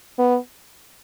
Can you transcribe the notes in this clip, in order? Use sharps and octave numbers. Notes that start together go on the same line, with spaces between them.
B3